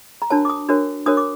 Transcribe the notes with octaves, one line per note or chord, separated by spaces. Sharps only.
A#5
D4 F#4 A#4 C#5 A5
D6
D#6
D4 F#4 A#4 C#5
D4 F#4 A#4 C#5 D#6
D6